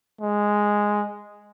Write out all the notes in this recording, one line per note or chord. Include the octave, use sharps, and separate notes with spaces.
G#3